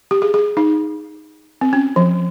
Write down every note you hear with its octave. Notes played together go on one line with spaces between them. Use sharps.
G4
G#4
G#4
D#4
C4
C#4
F3